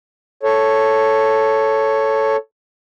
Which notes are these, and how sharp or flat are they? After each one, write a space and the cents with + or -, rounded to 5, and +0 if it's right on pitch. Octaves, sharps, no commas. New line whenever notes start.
A4 +0 C#5 +0